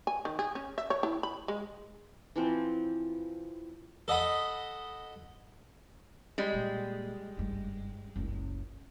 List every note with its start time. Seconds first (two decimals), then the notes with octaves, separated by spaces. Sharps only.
0.07 G#5
0.25 D#3
0.39 G#4
0.55 C#4
0.78 E5
0.90 C#5
1.03 E4
1.23 B5
1.48 G#3
2.36 E3 F3 C4
4.08 A4 D#5 F#5 B5
6.38 G3 G#3
6.53 A#2 A#3
7.37 F#1 G2
8.16 F#1 C#2